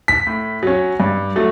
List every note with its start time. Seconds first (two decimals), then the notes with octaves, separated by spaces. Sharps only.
0.08 B6
0.27 A2
0.63 F#3 C#4
1.00 G2
1.36 F#3 A3